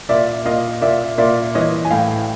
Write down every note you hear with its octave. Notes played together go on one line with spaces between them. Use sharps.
A#2 D5 E5
A#2 D#5 F5
A#2 D5 E5
A#2 D5 E5
E3 C#5 D#5
G#5
A2 F5 G5